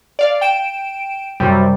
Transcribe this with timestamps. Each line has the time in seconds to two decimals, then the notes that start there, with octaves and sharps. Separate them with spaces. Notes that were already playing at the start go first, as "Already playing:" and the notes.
0.19 D5 F5
0.41 G5 D7 E7
1.40 F#2 C3 G3